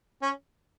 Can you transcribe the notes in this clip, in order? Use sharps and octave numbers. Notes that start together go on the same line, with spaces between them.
C#4